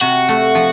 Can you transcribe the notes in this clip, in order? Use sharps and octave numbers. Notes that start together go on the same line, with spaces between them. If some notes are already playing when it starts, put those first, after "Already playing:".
C3 F#4
A3
F3